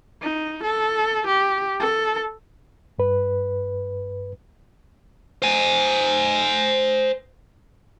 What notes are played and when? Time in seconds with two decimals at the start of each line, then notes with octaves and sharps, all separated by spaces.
0.22 D#4
0.64 A4
1.27 G4
1.80 A4
2.99 G2 B4
5.42 C5 G#5